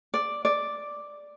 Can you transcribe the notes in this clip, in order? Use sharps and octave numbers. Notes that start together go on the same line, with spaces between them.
D5
D5